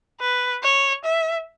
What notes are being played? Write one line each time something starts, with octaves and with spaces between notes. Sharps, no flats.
B4
C#5
E5